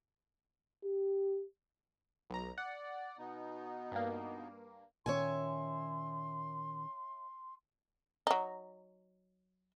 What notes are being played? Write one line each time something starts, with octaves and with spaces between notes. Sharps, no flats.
G4
B1 A#5
D5 F#5
B2 B3 D#4
G2 A#3
A#2 D#3 C#4 C#5 E5 G#5 C6
F#3 D#4